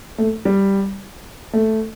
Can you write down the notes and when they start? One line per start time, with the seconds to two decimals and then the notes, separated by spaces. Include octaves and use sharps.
0.18 A3
0.45 G3
1.53 A3